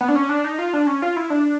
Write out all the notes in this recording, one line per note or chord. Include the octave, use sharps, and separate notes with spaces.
B3
D4
C#4
D4
D#4
F4
D4
C#4
F4
E4
D4